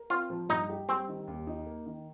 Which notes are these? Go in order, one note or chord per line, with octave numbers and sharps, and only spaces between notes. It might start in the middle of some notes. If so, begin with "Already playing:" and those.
Already playing: A#4
C4 F4
F3
G2 D#4
G4
G3 C4
D#3
D#2
D#4
A#3
D#3